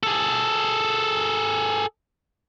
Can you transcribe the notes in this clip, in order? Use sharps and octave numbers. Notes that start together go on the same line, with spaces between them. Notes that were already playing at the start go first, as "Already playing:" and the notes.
G#4 A4